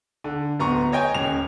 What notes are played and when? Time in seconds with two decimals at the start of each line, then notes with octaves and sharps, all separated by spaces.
0.24 D3
0.60 D1 B3 A#5 C6 C#6
0.92 C#5 D#5 G5 G#5
1.14 D#1 C#4 F7